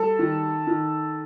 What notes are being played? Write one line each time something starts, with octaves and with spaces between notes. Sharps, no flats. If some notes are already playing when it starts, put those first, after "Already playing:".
Already playing: G3 A4
D#3
D#3